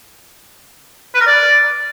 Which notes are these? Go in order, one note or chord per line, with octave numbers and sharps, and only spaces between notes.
B4
A#4
D5